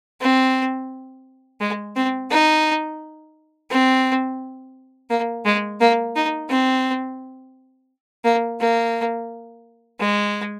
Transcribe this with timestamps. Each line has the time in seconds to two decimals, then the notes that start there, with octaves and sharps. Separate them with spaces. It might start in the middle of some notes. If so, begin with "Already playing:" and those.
0.21 C4
1.61 G#3
1.96 C4
2.30 D#4
3.71 C4
5.10 A#3
5.45 G#3
5.81 A#3
6.16 D#4
6.50 C4
8.25 A#3
8.60 A#3
10.00 G#3